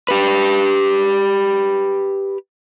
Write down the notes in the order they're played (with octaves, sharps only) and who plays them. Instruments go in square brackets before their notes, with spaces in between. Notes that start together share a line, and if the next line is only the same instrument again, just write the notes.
[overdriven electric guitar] G4 B4